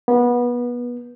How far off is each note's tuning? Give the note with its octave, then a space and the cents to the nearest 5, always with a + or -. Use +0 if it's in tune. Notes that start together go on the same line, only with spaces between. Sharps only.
B3 -25